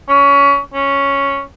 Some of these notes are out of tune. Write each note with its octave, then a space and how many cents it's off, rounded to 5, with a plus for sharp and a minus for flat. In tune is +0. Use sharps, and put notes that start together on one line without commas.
C#4 +25
C#4 +0